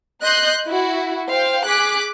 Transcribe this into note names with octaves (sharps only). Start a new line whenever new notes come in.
D#5 C6 F#6 G6
E4 F#4
C5 F5 G5
G#4 D6 F#6 B6